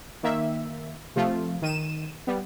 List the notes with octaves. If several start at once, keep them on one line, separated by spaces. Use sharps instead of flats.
D#3 A#3 E5
C3 F3 A3 F4
D#3 D#7 E7
G3 B3